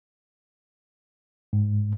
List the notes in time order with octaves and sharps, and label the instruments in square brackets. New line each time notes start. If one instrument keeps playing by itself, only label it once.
[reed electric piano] G#2